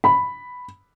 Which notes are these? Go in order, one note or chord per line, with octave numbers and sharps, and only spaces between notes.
B5